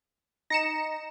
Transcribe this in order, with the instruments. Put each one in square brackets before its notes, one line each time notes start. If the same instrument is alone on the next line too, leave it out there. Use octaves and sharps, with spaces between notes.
[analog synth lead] D#4 [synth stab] A#6 C#7 E7